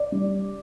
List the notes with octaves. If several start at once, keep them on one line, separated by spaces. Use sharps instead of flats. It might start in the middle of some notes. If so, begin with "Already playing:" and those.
Already playing: D5
G3